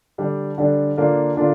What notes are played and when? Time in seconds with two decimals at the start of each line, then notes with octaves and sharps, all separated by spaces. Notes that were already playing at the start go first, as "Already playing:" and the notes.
0.18 D3 G3 D4
0.58 D3 G3 D4
0.97 D3 A#3 D4 F4
1.37 D3 A#3 D4 F4